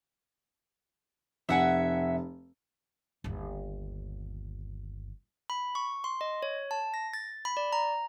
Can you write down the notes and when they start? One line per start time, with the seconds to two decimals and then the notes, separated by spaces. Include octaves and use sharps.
1.49 F1 E5 F#5 G#5
3.24 G1 D#2
5.50 B5
5.75 C#6
6.04 C6
6.21 D#5
6.42 C#5
6.71 A5
6.94 A#6
7.13 A6
7.45 B5
7.57 D5
7.73 A#5